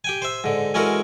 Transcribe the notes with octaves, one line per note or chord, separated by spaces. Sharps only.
G4 G5 G#5
C5 E5
G#2 D3
E3 G#3 C#4 F#4 A4 A#4